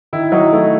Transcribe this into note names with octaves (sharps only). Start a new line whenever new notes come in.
D#3 E4
F#3 D#4
A3 E4